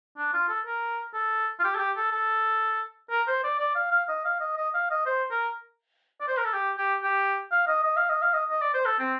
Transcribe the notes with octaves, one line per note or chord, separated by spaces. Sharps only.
D4
F4
A4
A#4
A4
F4
G4
A4
G4
A4
A4
A#4
C5
D5
D5
F5
F5
D#5
F5
D#5
D#5
F5
D#5
C5
A#4
D5
C5
A#4
A4
G4
G4
G4
F5
D#5
D#5
F5
D#5
F5
D#5
D#5
D5
C5
A4
C4